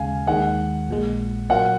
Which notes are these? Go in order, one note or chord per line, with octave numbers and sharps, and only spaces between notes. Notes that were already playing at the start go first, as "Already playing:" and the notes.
Already playing: D#2 C#3 G#3 F5 G#5
D#2 D#3 G#3 F#5
A#1 A#2 G#3
A#2 F#3 A#3 F4 F#5